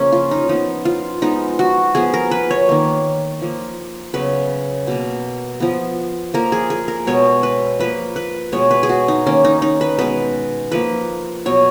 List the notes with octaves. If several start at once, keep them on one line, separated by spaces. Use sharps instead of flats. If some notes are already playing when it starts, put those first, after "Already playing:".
Already playing: C#3 F3 A#3 C#4
F4
D#4
F3 B3 D#4
F4
F3 G#3 B3 D#4
F#4
F3 B3 G#4
A#4
B4
C#5
D#3 A#3
F3 A#3
C#3 F#3 B3 B4
B2 A#3
F3 B3
F3 A#3 A#4
G#4
G#4
A#4
B2 G#3 B3 C#5
B4
F3 A#3 B4
B4
B2 G#3 B3 C#5
B4
G#4
F#4
D#4
D#3 A#3 C#4
D#4
D#4
B4
B2 G#3 B3 B4
F3 A#3 B4
B2 F#3 B3 C#5